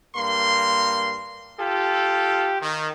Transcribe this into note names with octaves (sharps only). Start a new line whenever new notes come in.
G2 A#3 C6
F4 G4 A4
D#3